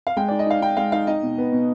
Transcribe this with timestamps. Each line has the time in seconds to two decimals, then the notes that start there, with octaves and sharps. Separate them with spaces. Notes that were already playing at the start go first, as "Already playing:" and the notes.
0.07 F5
0.17 G#3 G5
0.28 D#4 D5
0.39 D#5
0.46 D#4 F5
0.62 D#4 G5
0.77 G#3 F5
0.92 D#4 F5
1.07 D#4 D#5
1.22 B2
1.38 B3
1.52 B2